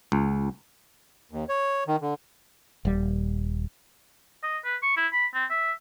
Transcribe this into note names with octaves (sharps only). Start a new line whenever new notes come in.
C#2
D#2
C#5
D#3
D3
D#1 G3
D#5
B4
C#6
E4
B5
C4
E5